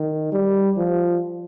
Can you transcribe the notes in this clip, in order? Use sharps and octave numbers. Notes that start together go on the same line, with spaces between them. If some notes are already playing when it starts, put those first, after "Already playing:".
Already playing: D#3
G3
F3